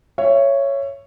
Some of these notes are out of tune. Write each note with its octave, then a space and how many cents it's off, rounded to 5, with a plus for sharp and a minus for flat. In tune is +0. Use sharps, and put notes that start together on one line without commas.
C#5 +0 E5 +30